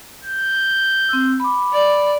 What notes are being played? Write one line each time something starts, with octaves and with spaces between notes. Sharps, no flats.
G6
C4 E6
B5 D6
D5